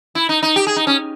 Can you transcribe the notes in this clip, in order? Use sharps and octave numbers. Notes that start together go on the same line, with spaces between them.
E4
D#4
D#4
G4
G#4
D#4
C#4